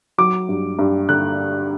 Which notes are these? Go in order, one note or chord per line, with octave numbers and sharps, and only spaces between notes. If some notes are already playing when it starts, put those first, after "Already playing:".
F#3 D6
G2
G2
D3 F#6